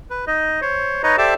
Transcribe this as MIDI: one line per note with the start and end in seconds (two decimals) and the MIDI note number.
0.11 0.25 71
0.27 0.60 63
0.27 0.60 75
0.62 1.02 72
0.62 1.02 73
1.03 1.16 63
1.03 1.16 71
1.03 1.16 73
1.03 1.16 75
1.03 1.16 82
1.18 1.34 67
1.18 1.34 69
1.18 1.34 72
1.18 1.34 74
1.18 1.34 76
1.18 1.34 81